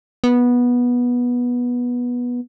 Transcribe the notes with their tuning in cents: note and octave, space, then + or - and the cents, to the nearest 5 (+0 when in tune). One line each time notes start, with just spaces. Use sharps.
B3 -15